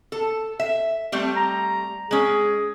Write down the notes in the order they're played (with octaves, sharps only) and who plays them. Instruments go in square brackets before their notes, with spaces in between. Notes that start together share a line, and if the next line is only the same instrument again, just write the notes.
[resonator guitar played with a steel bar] A4
E5
G3 A3 C4
[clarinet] A#5
[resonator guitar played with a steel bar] G#3 C#4 [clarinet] G#4